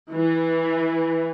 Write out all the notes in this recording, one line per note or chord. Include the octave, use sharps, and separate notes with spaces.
E3